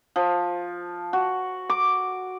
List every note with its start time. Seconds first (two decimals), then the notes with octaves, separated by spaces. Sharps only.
0.16 F3
1.13 F#4
1.70 D6